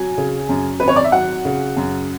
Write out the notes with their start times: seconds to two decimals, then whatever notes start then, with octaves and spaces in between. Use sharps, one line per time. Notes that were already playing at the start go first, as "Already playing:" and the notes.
Already playing: F#3 G#5
0.18 C#3
0.49 F#2
0.80 G#1 B4
0.88 C#5
0.96 D5
1.04 E5
1.12 F#3 F#5
1.45 C#3
1.77 F#2